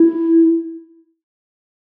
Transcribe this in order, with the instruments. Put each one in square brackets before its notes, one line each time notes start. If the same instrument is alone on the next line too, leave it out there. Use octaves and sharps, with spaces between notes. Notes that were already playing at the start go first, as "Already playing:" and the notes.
Already playing: [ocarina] E4